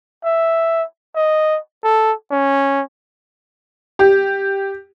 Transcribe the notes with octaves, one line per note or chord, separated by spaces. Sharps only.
E5
D#5
A4
C#4
G4